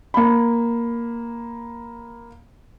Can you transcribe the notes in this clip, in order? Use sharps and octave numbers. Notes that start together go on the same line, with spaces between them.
A#3 B5